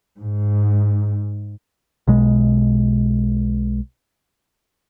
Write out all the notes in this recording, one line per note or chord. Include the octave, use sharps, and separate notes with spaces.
G#2
B1 B2 G#3